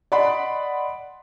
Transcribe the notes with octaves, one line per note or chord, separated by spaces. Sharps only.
D5 D#5 F#5 B5 C6